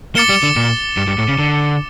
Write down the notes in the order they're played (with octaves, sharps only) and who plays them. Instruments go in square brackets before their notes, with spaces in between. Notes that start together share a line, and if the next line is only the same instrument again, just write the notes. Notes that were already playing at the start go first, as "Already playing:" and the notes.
[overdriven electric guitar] A#3 [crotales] D6 A6 C#7 E7 G7
[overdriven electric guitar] G3
D3
A#2
G2
G2
A2
C#3
D3